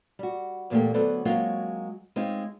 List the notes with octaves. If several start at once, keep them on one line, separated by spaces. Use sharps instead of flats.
G3 F#4
E2 A#2 A3 A#3 G4
D2 F#3 B3 A4 C5 D5
F#3 G#3 A#3 C4 C#4 F4
G#3 C4 C#4 D#4 F4